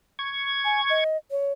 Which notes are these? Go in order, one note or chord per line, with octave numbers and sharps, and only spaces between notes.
C#6 G#6
G#5
D#5
C#5